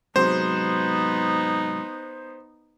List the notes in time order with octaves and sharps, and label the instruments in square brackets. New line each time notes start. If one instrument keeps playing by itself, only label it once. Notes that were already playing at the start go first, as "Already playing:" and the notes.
[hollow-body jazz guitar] G#2 C3 F#3 [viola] B3 D#4 [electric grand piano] C5